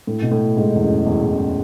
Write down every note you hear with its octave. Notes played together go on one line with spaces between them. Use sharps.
A2
B2
A2
G#2
E2
F#2
E2
E2
F#2